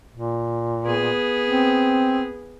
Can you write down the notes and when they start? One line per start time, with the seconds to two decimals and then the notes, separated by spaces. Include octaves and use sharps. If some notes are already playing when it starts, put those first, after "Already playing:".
0.12 A#2
0.86 B3 G#4
1.48 C4